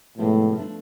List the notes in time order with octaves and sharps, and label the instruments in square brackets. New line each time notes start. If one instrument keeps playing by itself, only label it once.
[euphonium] A2 [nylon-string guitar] C3 F3 G#3 B3 E4
[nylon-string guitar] F3 A3 D4